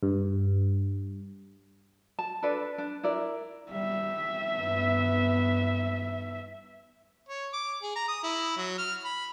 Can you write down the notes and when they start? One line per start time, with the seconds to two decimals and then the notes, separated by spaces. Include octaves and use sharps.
0.03 G2
2.19 A5
2.43 D4 A4 B4 D5
2.78 D4
3.03 E4 A#4 D5
3.72 G3 E5
4.57 G2 B3
7.29 C#5
7.54 D6
7.83 G#4
7.96 A#5
8.09 D#6
8.23 E4
8.57 F#3
8.78 F6
9.05 B5